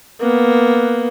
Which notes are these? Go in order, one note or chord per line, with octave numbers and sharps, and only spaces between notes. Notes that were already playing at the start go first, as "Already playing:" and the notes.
A#3 B3